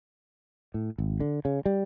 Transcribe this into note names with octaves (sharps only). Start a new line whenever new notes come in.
A2
G#1
D3
C#3
G3